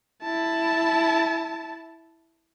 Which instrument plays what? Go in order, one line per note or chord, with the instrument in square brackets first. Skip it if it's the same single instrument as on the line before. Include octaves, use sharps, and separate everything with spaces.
[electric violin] E4 A5